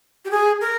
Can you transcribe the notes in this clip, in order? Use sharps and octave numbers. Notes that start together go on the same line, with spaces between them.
G4
G#4
A#4